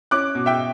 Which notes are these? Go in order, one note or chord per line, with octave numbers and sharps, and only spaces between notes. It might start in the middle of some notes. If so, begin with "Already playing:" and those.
C#4 D6 F#6
B2
E5 G5